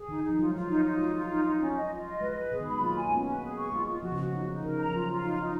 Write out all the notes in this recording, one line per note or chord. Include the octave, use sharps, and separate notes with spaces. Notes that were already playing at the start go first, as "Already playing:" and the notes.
Already playing: G#4
D#3 D#4
D#3
D#4
F3
F#3 F4
G#3
F#3 F4
F#3 D#4
D#4
G#3 F4
F4
D#4
D#4
C#4
D#5
F4
D#5
G#3 B4
B4
B2 G#4
D#3
B5
G#3
F#3 A#3 F4
G#5
G#3 B3 C#4
B4
G#4
C#6
G#3 F4
F4
F3 F#4
C#3
F#4
C#3
D#4
D#4
C#3 A#4
A#5
F3
F#3 F4
F4
D#4
D#4